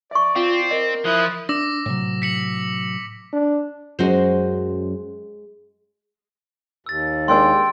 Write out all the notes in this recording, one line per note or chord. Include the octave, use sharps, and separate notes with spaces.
D5 E5 C#6
C4 F4 F5
A#4 D#5
F3 E4 D#6 F#6
D4 D6 E6 A#6
A2 C3 F#3
B6 C#7 F#7
D4
F#2 G#3 F#4 C5
D#2 E6 A6
G#3 A#3 D4 G5 C6 E6